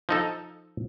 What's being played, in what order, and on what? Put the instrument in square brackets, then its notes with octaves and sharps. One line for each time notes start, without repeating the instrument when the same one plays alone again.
[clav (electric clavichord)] F3 D#4 A4